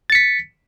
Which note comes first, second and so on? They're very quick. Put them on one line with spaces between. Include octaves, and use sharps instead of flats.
A6 C#7 B6